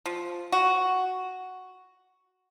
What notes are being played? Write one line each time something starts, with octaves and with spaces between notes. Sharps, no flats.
F3
F#4